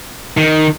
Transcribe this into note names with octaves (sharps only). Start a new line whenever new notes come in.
D#3